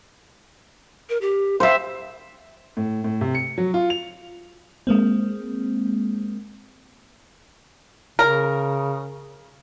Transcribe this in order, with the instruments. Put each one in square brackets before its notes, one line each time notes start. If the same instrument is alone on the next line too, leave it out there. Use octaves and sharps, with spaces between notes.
[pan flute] A#4
G4
[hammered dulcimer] C5 E5 [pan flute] F5
[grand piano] A2
A2
C3
C#7
F#3
F4
F7
[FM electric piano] G#3 A#3 C4
[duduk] C#3 [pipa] A#4